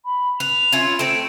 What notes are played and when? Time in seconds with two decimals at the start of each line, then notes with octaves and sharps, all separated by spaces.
0.05 B5
0.40 B4 F7
0.72 C#4 E4 F4
0.99 A3 C4 D7